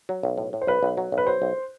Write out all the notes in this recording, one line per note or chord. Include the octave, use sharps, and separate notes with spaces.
F#3
B1
A2
A2
C5
B1 B4
B1
F#3
B1
B4
F#3 C5
B1